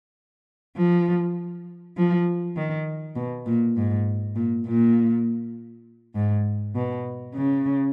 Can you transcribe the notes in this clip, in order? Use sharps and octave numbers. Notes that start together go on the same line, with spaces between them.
F3
F3
D#3
B2
A#2
G#2
A#2
A#2
G#2
B2
C#3